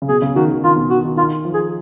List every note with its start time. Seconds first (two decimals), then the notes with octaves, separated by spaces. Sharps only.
0.02 C#3
0.08 B2 G#4
0.22 C#3
0.36 D#3 F#4
0.50 D#3
0.64 D#3 F4
0.76 B2
0.90 D#3 F#4
1.04 D#3
1.17 D#3 F4
1.45 F3
1.54 G#4